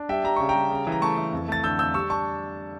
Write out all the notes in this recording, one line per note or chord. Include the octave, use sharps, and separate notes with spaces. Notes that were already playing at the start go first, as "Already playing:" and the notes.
Already playing: D4
G3 E5 G5
G3 A#5
C#3 C#6
G5 A#5
G3
C#3
E3
A#5
A3 A5 C#6
E3
F2
A3 A6
D3 E6 G6
F2 E6 G6
G3 C#6 E6
D4 A5 C#6